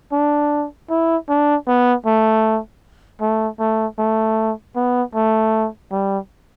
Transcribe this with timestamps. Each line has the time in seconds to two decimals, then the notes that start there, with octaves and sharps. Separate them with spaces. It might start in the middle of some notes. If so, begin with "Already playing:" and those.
0.12 D4
0.90 E4
1.29 D4
1.67 B3
2.06 A3
3.21 A3
3.60 A3
3.98 A3
4.76 B3
5.15 A3
5.92 G3